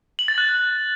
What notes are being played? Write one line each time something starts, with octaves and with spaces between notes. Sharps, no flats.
F#7
A6
F#6